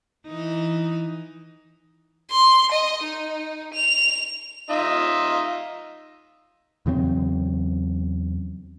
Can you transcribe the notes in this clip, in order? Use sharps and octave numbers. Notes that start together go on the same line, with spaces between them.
E3 D#4
C6
D#5
D#4
F7
D#4 F4 E5
E2 C#3 F#3 C4